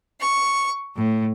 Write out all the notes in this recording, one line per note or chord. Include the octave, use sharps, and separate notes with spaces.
C#6
A2